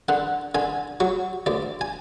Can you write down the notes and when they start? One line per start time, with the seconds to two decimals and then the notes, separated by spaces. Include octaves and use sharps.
0.09 D3 F#5
0.55 D3 G#5
1.00 F#3 C#6
1.46 D2 D5
1.81 G#5